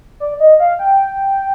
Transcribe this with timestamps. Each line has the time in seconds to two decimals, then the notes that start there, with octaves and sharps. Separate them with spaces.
0.20 D5
0.40 D#5
0.60 F5
0.79 G5